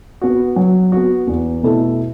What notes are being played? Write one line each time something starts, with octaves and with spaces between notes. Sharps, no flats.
B3 F#4
F#3
B3 F#4
E2
B2 A3 E4 A4